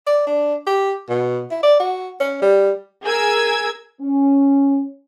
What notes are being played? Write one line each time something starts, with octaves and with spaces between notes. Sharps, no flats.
D5
D4
G4
B2
E4
D5
F#4
C#4
G3
G#4 A#4 E6 G#6
C#4